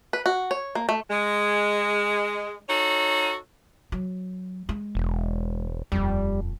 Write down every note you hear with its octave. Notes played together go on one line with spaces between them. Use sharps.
B4
F#4
C#5
A#3
A3
G#3
D#4 F#4 A4 C#5
F#3
G#3
E1
D#1 F2 G3